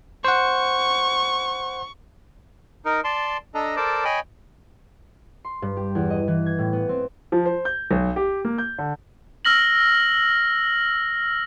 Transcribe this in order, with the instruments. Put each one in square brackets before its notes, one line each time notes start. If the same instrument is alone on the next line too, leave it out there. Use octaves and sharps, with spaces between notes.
[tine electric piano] C5 F#5 [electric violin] C#6
[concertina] D#4 A#4
D5 A5 C6
D4 A4 D#5 A#5
A4 A#4 C5 D5 A5 D6
C#5 D#5 G5 G#5 B5
[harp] C6
G2
G4
E2
D#5
E3
G#6
A2
B3
C4
[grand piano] F3
C5
G6
B1
G4
A#3
G6
D3
[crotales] E6 F6 A#6 F#7